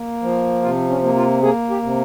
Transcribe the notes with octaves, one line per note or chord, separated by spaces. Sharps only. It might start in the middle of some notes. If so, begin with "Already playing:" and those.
Already playing: A#3
F3
C3 F4
C#4
A#3
F4
A#3 G#4
G4
C3